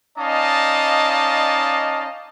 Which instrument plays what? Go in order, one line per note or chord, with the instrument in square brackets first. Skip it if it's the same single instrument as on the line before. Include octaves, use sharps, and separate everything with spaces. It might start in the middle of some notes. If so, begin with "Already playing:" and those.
[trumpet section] C#4 D#4 D5 D#5 F5 A5